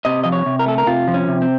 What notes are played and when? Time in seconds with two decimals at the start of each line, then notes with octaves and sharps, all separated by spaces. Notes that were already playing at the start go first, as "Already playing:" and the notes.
0.05 C3 D#5
0.24 F3 D#5
0.32 C#5
0.46 C3
0.59 A#4
0.66 A3 A4
0.78 A#4
0.87 C3 F4
1.08 F3
1.14 C#4
1.28 C3
1.42 C4